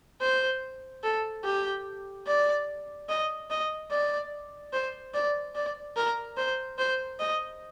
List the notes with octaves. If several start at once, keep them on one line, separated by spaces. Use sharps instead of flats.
C5
A4
G4
D5
D#5
D#5
D5
C5
D5
D5
A#4
C5
C5
D#5